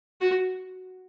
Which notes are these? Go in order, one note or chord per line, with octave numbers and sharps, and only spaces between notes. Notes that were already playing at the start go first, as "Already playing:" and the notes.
F#4